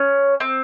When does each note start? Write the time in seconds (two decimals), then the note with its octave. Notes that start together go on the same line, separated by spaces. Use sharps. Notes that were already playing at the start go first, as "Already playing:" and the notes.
Already playing: C#4
0.40 C4